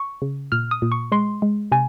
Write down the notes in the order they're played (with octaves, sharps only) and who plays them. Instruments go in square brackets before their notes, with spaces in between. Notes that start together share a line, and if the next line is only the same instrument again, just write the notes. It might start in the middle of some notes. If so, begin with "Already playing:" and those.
Already playing: [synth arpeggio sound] C#6
C#3
A#2 F6
D#6
A#2
C#6
G#3 C6
G#3
C3 G#5